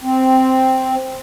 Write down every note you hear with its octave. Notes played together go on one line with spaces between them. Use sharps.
C4